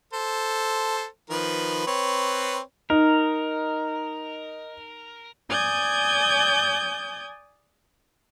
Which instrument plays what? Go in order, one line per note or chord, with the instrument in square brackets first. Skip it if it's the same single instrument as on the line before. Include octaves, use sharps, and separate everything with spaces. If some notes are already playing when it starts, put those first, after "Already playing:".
[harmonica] A4 C5
D#3 F3 B4
C4 B4 C#5
[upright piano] D#4 [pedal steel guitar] A#4
[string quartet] D5 G#5 D#6 G6 G#6